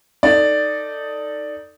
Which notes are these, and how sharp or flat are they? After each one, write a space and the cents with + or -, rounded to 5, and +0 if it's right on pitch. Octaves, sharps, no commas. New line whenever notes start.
D#4 +0 A4 +20 D5 +0